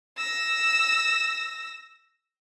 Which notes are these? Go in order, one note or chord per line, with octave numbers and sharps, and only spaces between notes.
E6 A#6